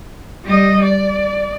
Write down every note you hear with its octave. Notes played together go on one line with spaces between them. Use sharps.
G3 D#5
D5